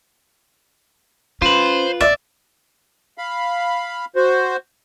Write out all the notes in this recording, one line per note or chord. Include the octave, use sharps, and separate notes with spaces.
C#4 F4 B4 C5
A#1 D5 E5
F5 B5
F#4 C5